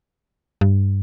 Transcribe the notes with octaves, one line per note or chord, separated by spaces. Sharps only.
G2